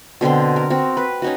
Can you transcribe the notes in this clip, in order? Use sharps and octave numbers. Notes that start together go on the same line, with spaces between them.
B2 D3 C4 C6
A#4
C4 F#4
B4
C#4 D#4 F#4